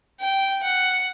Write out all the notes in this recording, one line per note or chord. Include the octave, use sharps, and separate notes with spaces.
G5
F#5